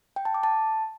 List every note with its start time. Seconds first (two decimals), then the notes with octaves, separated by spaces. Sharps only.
0.16 G5
0.25 A5
0.34 D6
0.43 A5